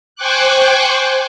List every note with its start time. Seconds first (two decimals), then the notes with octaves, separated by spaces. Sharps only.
0.15 C5 G5 G#5 C#6 D6 F#6